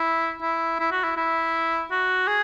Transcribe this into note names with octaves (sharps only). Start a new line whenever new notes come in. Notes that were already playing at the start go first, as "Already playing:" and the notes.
Already playing: E4
E4
E4
F#4
E4
E4
F#4
G#4